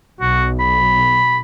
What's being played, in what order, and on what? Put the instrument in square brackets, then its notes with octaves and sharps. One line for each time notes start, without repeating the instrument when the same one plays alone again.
[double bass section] B1 [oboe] F#4
[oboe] B5